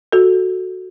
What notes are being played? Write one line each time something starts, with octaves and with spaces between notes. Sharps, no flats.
F#4 A4